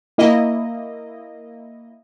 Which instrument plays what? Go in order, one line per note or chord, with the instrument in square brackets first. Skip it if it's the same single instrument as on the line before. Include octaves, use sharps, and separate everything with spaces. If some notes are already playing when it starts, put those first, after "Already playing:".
[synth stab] A#3 E4 D#5